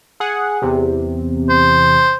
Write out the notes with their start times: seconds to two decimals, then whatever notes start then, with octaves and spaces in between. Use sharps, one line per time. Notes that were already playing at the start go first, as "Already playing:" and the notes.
0.20 G#4 F#5
0.62 E2 C3
1.50 C5